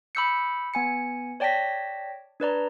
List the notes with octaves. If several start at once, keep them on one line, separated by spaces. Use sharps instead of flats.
B5 D6 E6 G6 C7 C#7
B3 G#5 C#7
C#5 D5 G5 A5 A#6 B6
D4 B4 D5 A#5